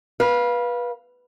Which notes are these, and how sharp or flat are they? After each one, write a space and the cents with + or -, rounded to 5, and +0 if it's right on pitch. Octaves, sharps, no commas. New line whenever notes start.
B4 -25 F5 +5